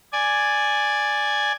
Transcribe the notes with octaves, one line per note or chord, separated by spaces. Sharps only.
D5 G#5